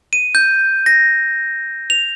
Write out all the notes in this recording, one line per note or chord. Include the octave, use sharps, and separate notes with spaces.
D#7
G6
A#6
F7